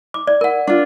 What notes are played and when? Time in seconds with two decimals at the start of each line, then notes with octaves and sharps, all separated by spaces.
0.14 D6
0.27 D5
0.41 A#4 F#5
0.67 D4 F4